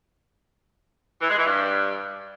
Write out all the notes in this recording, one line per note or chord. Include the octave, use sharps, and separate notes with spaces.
E3
G#3
E3
G2